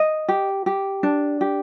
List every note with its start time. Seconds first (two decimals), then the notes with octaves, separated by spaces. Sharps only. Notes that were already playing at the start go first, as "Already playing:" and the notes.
Already playing: D#5
0.29 G4
0.66 G4
1.03 D4
1.41 G4